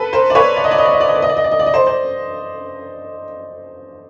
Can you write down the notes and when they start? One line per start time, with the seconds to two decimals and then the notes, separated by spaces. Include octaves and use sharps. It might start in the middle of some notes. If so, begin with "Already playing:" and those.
Already playing: A4 B4
0.13 A#4 C5
0.30 D5
0.35 B4 C#5
0.56 D5
0.64 D#5
0.71 D5
0.78 D#5
0.85 D5
0.93 D#5
1.01 D5
1.08 D#5
1.15 D5
1.22 D#5
1.29 D5
1.37 D#5
1.44 D5
1.51 D#5
1.59 D5
1.66 D#5
1.73 C5 D5
1.86 C5 D5